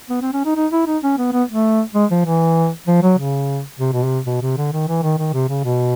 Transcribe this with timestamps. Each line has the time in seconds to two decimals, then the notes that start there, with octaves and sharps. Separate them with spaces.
0.10 B3
0.21 C4
0.33 C#4
0.45 D#4
0.56 D#4
0.72 E4
0.87 D#4
1.03 C#4
1.18 B3
1.33 B3
1.49 A3
1.95 G#3
2.11 F3
2.26 E3
2.87 F3
3.03 F#3
3.18 C#3
3.80 C3
3.93 B2
4.05 C3
4.26 B2
4.41 C3
4.57 D3
4.73 D#3
4.88 E3
5.03 D#3
5.18 D#3
5.33 C3
5.49 C#3
5.64 B2